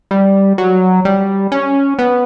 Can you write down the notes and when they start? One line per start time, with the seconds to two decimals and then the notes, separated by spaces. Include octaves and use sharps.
0.11 G3
0.58 F#3
1.05 G3
1.52 C#4
1.99 B3